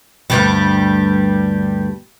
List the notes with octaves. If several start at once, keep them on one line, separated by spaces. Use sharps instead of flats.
D2 G2 G3